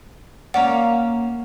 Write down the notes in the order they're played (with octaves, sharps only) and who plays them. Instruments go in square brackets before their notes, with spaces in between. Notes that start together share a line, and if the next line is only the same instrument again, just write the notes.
[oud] A#3 C#4 D5 [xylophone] F#5